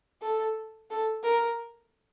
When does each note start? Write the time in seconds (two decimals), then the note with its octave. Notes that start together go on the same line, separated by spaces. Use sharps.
0.22 A4
0.90 A4
1.24 A#4